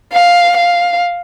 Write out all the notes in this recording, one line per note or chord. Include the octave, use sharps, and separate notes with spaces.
F5
F5